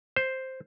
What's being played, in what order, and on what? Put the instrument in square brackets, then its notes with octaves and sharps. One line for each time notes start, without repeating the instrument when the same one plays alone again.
[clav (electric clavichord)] C5